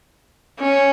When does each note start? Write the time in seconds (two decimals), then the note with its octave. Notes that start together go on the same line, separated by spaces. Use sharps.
0.59 C#4